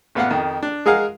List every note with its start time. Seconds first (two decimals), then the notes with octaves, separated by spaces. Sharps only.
0.15 A1 B3 F5 F#5
0.30 F2 D#3
0.63 D4
0.86 G#3 G#4 A#4 F5 F#5